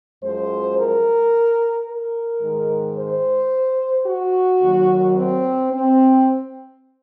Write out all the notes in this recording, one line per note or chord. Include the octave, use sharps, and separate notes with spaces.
F#2 F3 G#3 C5
A#4
A#4
G#2 D#3 G#3
C5
F#4
D#2 D#3 F#3
C4
C4